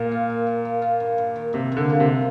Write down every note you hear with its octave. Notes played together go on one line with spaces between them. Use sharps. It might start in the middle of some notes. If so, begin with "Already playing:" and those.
Already playing: A#2 A#3 A#4
F4
A#4
A#3
A#3
F4
G2
G2
D#3
G2 C3
G2 D3
D3 A#3
C3